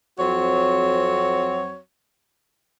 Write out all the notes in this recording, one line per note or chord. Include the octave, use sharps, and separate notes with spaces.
F2 F#3 C4 F#4 C#5